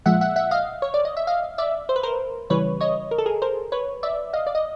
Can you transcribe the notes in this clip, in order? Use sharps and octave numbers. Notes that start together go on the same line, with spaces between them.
A#2 F3 G#3 E5 F#5
E5 F#5
E5 F#5
D#5 F5
C#5
D5
D#5
E5
D#5 F5
D5 E5
C5
B4
A#4 C5
C#3 E3 G3 B4 C#5
C#5 D#5
A#4
A4
G#4 A#4
A#4 C5
B4 C#5
D5 E5
D#5 F5
D5
D#5